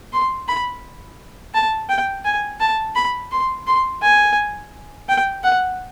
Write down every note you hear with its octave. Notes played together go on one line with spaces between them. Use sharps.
C6
B5
A5
G5
G#5
A5
B5
C6
C6
G#5
G5
F#5